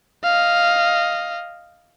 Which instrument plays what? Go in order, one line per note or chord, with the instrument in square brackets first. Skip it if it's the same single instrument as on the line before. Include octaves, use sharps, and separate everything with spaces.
[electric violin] D#5 F5